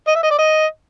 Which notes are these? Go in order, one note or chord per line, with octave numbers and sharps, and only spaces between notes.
D#5
E5
D#5
D5
D#5